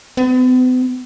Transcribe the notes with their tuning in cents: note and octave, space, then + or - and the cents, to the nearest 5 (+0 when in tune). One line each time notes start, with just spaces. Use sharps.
B3 +45